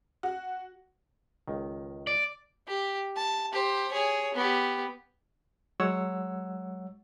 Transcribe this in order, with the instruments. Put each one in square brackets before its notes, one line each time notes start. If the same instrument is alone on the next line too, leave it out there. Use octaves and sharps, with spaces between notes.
[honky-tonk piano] F#4
[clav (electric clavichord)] C#2 D#3
[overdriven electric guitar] D5
[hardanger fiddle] G4
A5
G4 C5
G#4 C#5
B3 G4
[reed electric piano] F#3 G#3 C#5 F#5 E6